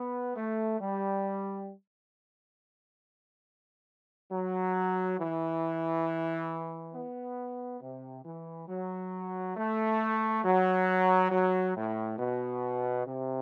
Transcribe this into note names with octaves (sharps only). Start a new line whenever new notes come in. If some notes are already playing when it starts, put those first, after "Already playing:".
Already playing: B3
A3
G3
F#3
E3
B3
C3
E3
F#3
A3
F#3
F#3
A2
B2
C3